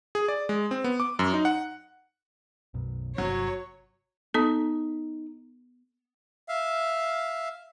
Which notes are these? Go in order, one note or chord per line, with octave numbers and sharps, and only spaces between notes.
G#4
D5
G#3
C4
B3
D6
F#2
D#4
F#5
B1 F#2 B2
G1 C3 F#3 C#5
B3 D#4 A4
E5 F5